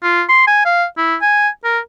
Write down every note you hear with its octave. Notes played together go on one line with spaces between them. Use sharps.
F4
C6
G#5
F5
E4
G#5
A#4